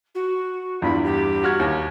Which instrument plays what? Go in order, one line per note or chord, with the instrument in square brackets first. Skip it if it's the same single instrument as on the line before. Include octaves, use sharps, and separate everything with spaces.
[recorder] F#4
[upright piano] E2 G2 F4 [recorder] B5
[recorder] G4
[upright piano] F#4 F6 G#6
[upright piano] D#2 [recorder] G4